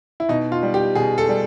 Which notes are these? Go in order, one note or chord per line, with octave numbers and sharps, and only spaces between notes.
E4
B2 D#4
F4
G3
G4
B2 G#4
A4
G3